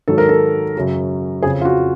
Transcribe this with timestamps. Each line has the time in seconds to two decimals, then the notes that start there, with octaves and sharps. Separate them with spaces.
0.08 G#2 D#3 F#3 A4
0.18 A#4
0.29 A4
0.76 F#2 C#3 F#3
1.42 F2 C#3 F3 G#4
1.61 F4
1.65 F#4